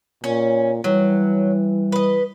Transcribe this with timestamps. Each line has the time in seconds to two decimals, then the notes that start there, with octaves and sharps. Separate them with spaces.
0.24 A#2 C#4
0.84 E3 F#3 G3
1.92 B4 D#5